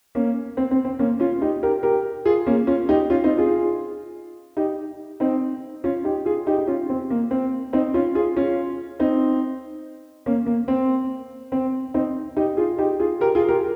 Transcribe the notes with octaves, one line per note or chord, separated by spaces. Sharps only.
A#3 C#4
C4
C4
C4
A#3 C#4
C#4 F4
D#4 G4
G4 A#4
G4 A#4
F4 G#4
A#3 C#4
C#4 F4
D#4 G4
C#4 F4
C4 D#4
F4 G#4
D#4 G4
C4 D#4
C#4 F4
D#4 G4
F4 G#4
D#4 G4
D#4
C#4 F4
C4
A#3
C4
C4 D#4
C#4 F4
F4 G#4
C#4 F4
C4 D#4
A#3 C#4
A#3
C4
C4
C4 D#4
D#4 G4
F4 G#4
D#4 G4
F4 G#4
G4 A#4
F4 G#4
G4 A#4